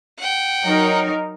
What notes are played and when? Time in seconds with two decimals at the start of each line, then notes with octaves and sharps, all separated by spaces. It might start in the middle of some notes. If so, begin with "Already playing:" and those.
0.18 F#5 G5
0.64 F#3 D#4 A#4